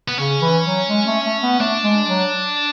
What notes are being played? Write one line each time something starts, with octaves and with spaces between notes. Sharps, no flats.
B3
C#3 C#4
E3
F#3
G#3
A3
A3
B3
A3 D4
G#3
F#3